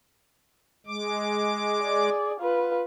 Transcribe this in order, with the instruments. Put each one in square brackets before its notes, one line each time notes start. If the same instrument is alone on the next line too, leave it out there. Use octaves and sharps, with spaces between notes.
[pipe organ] G#3 D6
[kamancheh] G#4 D5
F4 B4